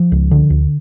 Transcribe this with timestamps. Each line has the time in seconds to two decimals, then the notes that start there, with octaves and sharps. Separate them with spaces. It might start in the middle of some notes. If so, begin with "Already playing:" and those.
Already playing: F3
0.12 C#2
0.31 D3
0.50 D2